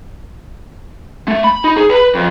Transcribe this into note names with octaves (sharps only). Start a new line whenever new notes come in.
A3
B5
D#4
G#4
B4
F2